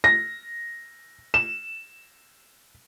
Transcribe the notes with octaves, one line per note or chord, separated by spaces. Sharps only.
A#6
E7